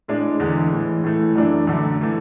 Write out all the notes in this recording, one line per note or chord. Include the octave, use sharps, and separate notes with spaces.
A2 G#3 D4
E2 D3 G#3
A2 E3 G#3
A2 E3 A3
F#2 E3 A3 D4
F#2 D3 A3
E3 A3